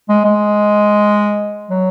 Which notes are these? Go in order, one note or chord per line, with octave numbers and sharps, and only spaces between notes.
G#3
G#3
F#3